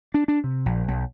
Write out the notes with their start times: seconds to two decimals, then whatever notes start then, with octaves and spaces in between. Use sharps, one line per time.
0.14 D4
0.28 D4
0.44 C3
0.66 A#1
0.88 B1